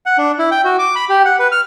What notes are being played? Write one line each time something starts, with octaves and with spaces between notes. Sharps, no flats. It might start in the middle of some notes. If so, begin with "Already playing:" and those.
F#5
D4
E4
G5
F#4
D6
B5
G4
F#5
B4
F6